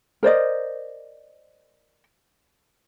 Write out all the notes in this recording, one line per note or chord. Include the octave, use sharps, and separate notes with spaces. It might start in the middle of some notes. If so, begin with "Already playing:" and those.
A#4 C5 D5 D#5